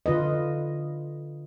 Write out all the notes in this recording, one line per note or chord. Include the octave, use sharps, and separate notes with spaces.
D3 F4 B4 D#5